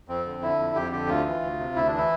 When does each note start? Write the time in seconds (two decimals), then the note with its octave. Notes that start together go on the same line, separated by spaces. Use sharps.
0.08 F2 C4
0.26 D3
0.42 D3 E4
0.59 F2
0.75 F2 G4
0.92 D3 G4
1.08 D2 F4
1.25 E3
1.42 D2
1.59 C3
1.76 D2 E4
1.87 D4
1.92 E3
1.97 E4